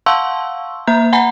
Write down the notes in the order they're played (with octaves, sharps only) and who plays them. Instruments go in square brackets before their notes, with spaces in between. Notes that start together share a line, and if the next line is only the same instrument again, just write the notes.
[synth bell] F5 F#5 A5 C6 C#6 E6
A#3 E5 A#5 G6
F#5 G#5 A#5 B5